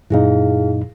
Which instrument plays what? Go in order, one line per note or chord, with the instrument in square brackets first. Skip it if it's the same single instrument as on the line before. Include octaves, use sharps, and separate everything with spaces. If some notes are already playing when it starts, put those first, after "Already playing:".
[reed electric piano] F#2 A#2 D#4 [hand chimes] E4 G#4 F5